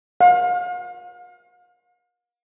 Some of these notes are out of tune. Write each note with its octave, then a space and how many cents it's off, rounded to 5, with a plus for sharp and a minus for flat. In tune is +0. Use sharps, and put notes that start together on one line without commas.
F5 +40